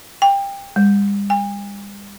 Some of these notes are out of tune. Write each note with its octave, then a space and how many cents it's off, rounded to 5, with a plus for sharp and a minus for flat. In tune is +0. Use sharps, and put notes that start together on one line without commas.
G5 +20
G3 +45
G#5 -45